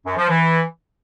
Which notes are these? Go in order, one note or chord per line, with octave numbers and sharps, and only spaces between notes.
F#2
F3
E3